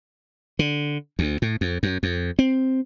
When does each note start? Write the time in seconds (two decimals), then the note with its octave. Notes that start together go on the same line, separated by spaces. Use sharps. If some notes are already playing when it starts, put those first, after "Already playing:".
0.59 D3
1.19 D2
1.42 A2
1.61 F2
1.83 F#2
2.03 F2
2.39 C4